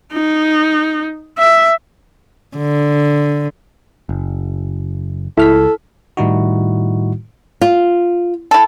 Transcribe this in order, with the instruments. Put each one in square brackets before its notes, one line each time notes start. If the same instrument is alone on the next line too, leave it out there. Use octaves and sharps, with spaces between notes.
[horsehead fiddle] D#4
E5
[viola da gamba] D3
[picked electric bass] F#1
[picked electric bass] C#2 [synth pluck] E4 F6 B6 [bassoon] A4
[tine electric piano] A2 D#3 G3 D#4 E4 F#4
[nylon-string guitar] F4
[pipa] E4 A4